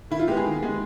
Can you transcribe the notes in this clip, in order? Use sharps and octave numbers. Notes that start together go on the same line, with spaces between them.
D#3 E4
F4
G#3 B3 G4
G#4
D#3
G#3 B3